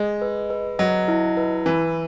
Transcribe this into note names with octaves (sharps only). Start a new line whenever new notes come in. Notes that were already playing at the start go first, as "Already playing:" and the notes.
Already playing: G#3 D#5
B4
B4
F#3 D#5
E4
B4
E3 B4